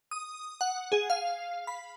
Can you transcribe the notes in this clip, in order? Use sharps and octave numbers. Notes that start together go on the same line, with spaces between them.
D#6
F#5
G#4
F5
B5